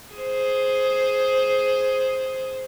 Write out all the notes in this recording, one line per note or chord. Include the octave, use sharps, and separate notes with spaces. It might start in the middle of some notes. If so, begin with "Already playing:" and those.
G#4 C5